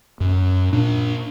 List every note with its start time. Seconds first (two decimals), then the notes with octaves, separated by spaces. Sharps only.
0.20 F#2
0.73 A#2 D4